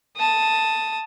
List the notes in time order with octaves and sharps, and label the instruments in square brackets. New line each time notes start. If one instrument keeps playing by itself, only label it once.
[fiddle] A5 D#6